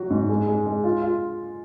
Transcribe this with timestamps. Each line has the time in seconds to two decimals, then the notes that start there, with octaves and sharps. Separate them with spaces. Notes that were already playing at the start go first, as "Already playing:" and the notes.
Already playing: F#3 F#4
0.10 G#2
0.29 G#3
0.47 G#3
0.66 G#3
0.84 F4
1.02 F4